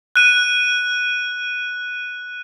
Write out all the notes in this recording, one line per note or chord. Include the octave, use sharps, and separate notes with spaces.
F#6 D#7